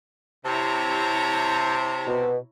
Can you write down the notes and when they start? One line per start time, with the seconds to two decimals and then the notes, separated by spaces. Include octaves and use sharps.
0.45 C3 E4 C#5 A5 A#5
2.07 B2